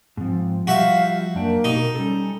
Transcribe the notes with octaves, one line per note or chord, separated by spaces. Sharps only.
G#2 F3 C4
F3 G3 F#4 G4 E5 F5
F#2 A#3 D4 G5
B2 D#4 F#4 G4
G3 C#4 A4